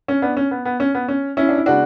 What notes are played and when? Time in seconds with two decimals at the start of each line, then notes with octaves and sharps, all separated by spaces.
0.08 C#4
0.22 B3 D4
0.37 C#4
0.51 B3
0.65 B3
0.80 C#4
0.94 B3
1.08 C#4
1.37 C#4 E4
1.49 D4
1.58 E4
1.66 C#3 G#3 B3 D4 F#4